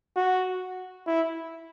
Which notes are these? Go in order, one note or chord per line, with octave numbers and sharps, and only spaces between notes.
F#4
E4